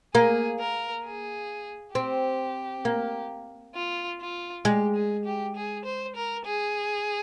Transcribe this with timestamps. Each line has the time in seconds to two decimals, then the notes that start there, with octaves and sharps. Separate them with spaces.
0.15 A#3 G#4
0.59 A#4
1.05 G#4
1.95 C4 G4
2.85 A#3
3.75 F4
4.21 F4
4.65 G#3 G4
4.95 G#4
5.25 G4
5.56 G#4
5.85 C5
6.15 A#4
6.46 G#4